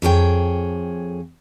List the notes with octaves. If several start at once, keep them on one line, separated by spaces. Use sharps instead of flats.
F2 G#4 C#5 G5